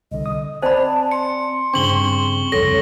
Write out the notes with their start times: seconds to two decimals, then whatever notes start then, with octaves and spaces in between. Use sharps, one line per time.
0.12 C2 D3 D#5
0.26 D#6
0.62 C4 C5 D5 G#5 A5 B5
1.11 C6 C#7
1.74 G2 C#3 C4 D4 C#6 F#7 G7
2.52 C2 F2 A4 C#5 A#6